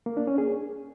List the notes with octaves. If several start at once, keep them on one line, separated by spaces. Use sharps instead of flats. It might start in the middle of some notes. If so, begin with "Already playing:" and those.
A#3
D4
C#4
G#4